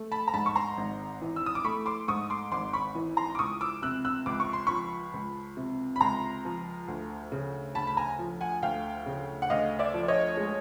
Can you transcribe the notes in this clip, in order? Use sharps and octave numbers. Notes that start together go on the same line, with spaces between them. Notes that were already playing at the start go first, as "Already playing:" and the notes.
Already playing: A3
A5 B5
A#5
G#2 A5 B5
C#6
A#5 C6
G#1
E3
E6
D#6
D6
A3 B5 C#6
C6 D6
G#2 C#6 D#6
C6 D6
G#1 C6 D6
B5 C#6
E3
A#5 C6
D6
C#2 C#6 D#6
D6 E6
C3 E6 F#6
E6 F#6
C#2 D6
C#6
C6
F3 B5 C#6
C#2
C3
B5
C#2 A#5 C6
F3
D2
C#3
D2 A5 B5
B5
G#5 A#5
F3
F#5 G#5
D2 F5 G5
C#3
F#5
D2 D#5 F5
D5 E5
F3
D5
C#5 D#5
G#3